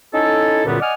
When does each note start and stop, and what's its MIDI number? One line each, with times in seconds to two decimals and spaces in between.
0.14 0.65 61
0.14 0.65 63
0.14 0.65 64
0.14 0.65 69
0.65 0.79 37
0.65 0.79 42
0.65 0.79 46
0.65 0.79 50
0.65 0.79 55
0.65 0.79 59
0.81 0.94 74
0.81 0.94 75
0.81 0.94 78
0.81 0.94 80
0.81 0.94 87
0.81 0.94 89